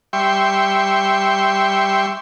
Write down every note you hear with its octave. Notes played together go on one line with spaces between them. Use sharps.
G3 E5 G5 C6 C#6